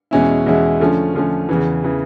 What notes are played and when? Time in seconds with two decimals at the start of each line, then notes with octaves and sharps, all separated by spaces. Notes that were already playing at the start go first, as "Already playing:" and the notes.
0.11 E2 B2 G#3 C#4 E4
0.46 E2 B2 G#3 C#4 E4
0.80 D3 F3 A3 C#4
1.14 D3 F3 A3 C#4
1.49 E2 C#3 E3
1.84 C#3 E3